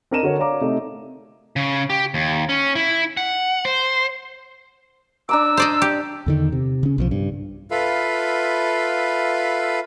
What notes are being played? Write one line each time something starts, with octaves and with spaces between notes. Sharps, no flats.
C4 D4 A#4 D#5 D#7 E7
D3 F#4 A#4 C#5
C#5 D5 F5 A#5 D6
C3 A3 D#4
C#3
G4
D#2
C#4
E4
F#5
C5
D4 A#5 D6 E6
C5 D5 D#5
G4
E2 D3 D#3
C3
C#3 C#4
B1 E3 F3
G2
F4 A4 B4 E5 F5 B5